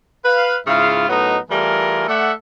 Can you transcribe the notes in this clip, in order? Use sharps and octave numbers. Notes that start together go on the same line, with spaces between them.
B4 F5
G#2 C#3 E4 F4 E5 F5
A2 F#3 B3 D#4 A#4 D#5
E3 G3 A3 F4 G#4 A#4
A3 A4 D5 E5 F#5